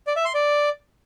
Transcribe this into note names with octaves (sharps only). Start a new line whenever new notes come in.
D5
E5
C6
D5